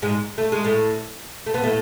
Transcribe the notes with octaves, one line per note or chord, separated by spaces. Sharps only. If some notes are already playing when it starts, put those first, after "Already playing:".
G#2 G#3
A3
G#3
A2 A3
A3
B3
A2 A3